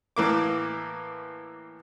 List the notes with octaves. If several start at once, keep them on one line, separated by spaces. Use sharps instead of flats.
A2 E3 A#3 D6